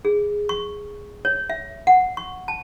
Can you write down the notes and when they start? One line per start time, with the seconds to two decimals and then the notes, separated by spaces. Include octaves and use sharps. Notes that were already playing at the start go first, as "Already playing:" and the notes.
0.05 G#4
0.49 C#6
1.25 C#5
1.50 E5
1.87 F#5
2.17 C#6
2.48 A5